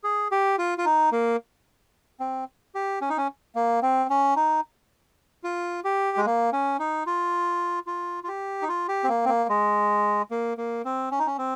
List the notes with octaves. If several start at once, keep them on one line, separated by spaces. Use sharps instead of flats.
G#4
G4
F4
F4
D#4
A#3
C4
G4
C#4
D#4
C#4
A#3
C4
C#4
D#4
F4
G4
G#3
A#3
C#4
D#4
F4
F4
F4
G4
D#4
F4
G4
C4
A#3
C4
A#3
G#3
A#3
A#3
C4
C#4
D#4
C#4
C4